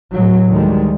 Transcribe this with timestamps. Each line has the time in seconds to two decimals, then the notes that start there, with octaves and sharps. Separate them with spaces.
0.13 A2 F#3
0.51 D2 D#3 G3 G#3